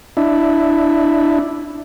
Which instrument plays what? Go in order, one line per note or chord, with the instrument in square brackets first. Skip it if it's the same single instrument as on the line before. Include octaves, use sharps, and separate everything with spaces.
[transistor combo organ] D4 E4